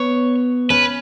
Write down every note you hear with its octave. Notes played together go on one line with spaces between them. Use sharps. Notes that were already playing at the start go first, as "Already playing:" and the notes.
Already playing: B3 C#5
C#4 B4